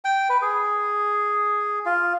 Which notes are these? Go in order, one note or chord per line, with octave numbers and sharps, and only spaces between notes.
G5
B4
G#4
F4